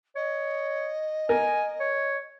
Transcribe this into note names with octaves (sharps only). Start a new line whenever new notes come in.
C#5 D#5
A#4 G#5
C#5